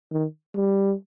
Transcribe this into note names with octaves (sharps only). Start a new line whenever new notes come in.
D#3
G3